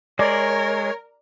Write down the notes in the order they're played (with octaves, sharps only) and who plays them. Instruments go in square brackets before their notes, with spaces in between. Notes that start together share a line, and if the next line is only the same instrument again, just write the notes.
[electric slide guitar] G#3 [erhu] A#4 [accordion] C#5 [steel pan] D5